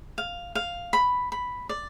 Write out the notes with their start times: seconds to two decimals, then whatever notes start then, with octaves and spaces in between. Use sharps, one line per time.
0.18 F5
0.55 F5
0.93 B5
1.32 B5
1.69 D5